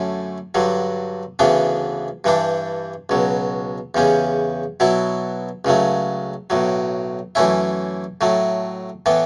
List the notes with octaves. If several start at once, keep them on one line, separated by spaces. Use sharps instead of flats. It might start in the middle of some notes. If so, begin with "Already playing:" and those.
Already playing: F#2 D3 A3 C#4
G2 D3 F#3
D2 C#3 E3 B3 D4
G2 E3 G3 D4
C#2 B2 F#3
E2 C#3 G3 C#4
B2 F#3 B3 E4
C#2 C#3 F#3 A3
B1 A2 F#3
F#2 E3 A3 C#4 E4
A2 F#3 A3
A2 E3 B3